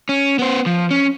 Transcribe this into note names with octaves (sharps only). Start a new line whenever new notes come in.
C#4
B3 C5
F3
C#4